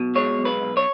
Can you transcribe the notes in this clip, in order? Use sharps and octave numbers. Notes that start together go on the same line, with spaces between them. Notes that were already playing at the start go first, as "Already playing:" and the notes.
Already playing: B1 B2
G#3 C#5
B1
B4
B1
C#5